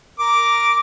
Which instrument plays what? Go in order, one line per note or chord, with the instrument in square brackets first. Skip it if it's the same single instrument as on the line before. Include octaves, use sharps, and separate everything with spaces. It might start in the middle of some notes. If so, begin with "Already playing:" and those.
[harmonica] A#4 D6